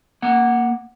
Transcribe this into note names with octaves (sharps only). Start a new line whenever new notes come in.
A#3 F#5